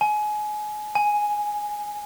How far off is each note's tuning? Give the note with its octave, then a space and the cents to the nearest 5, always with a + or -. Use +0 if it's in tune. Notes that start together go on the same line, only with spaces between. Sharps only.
G#5 +25
G#5 +0